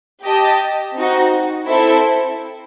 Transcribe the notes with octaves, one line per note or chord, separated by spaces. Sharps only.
G4 D#5 A5
C4 D#4 F#4
C4 E4 A4 C5 E5